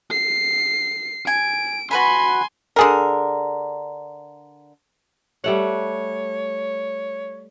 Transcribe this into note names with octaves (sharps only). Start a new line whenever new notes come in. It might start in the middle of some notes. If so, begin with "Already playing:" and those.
C7
G#5 D7
F#4 B4 G#5 B5 C6
D3 G#4 A#4
G3 A3 C#5 F#5